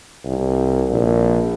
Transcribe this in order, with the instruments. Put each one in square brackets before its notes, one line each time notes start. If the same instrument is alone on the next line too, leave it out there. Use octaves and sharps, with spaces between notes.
[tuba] C2
A#1